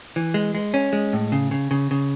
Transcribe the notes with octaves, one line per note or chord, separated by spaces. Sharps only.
E3
G#3
G#3
C#4
G#3
A2
C#3
C#3
C#3
C#3